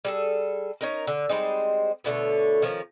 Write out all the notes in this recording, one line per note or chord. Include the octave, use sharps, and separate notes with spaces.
G3 G#4 A4
C#4 D#4 A#4
D3
G3 G#3 C4 D#4
B2 D3 A3 C#5
D#3 F3 C#4